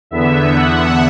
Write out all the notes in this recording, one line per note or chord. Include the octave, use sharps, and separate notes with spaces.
E2 D3 B3 E5
F#5